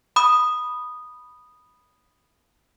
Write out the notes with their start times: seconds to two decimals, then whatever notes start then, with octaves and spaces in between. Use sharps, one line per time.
0.16 B5 D#6